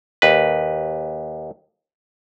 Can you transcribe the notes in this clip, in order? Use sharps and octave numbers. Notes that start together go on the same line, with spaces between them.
D#2 B4